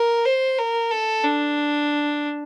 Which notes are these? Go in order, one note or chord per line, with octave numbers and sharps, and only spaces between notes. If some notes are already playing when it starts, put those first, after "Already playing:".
Already playing: A#4
C5
A#4
A4
D4